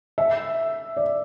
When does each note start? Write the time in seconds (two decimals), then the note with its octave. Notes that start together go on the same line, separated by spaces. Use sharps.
0.18 E5
0.97 D5